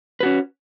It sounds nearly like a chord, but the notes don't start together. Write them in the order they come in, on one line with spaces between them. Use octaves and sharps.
B4 F#4 C#4